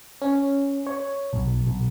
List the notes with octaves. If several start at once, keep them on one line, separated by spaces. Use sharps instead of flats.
C#4
C#5
B1
B1